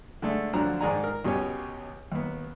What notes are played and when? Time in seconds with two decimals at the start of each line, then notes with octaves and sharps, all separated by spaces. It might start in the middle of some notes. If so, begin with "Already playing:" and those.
0.22 D3 G#3 A3 D4
0.53 D2 D3 F3 F#3 D4 A#5
0.81 G#2 D#3 G#3 D5 G#5 A#5
1.04 A#4
1.25 C#2 B2 G4 C#5 G#5
2.12 D#2 B3